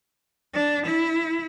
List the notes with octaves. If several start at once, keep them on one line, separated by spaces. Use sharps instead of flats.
D4
E4